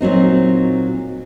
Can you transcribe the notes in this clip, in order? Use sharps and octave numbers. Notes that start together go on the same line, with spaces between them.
A#2 F#3 C4 D#4